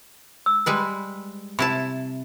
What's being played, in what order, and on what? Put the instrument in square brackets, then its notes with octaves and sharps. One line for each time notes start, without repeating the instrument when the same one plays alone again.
[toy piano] E6
[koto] G3 G#3 B4
[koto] C3 E4 A5 [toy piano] B5